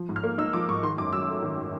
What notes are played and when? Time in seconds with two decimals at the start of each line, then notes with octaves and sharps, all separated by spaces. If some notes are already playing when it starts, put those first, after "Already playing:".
Already playing: F3
0.09 G#2
0.16 F6
0.24 A#3
0.38 D#4 E6
0.53 F3 D6
0.68 G#2 C#6
0.83 D#3 C6
0.98 F#2 D6
1.13 F#3 E6
1.28 A3
1.43 D#3